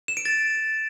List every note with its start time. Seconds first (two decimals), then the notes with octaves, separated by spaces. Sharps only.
0.08 E7
0.17 D7
0.25 A6